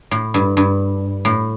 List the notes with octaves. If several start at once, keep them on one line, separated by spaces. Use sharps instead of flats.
A2
G2
G2
A2